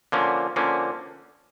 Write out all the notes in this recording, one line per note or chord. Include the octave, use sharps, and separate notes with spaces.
D3 F3 A#3 C#4
D3 F3 A#3 C#4